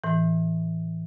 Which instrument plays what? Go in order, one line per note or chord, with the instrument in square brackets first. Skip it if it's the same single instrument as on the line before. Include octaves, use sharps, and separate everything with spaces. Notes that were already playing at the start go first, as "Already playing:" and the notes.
[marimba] A2 E3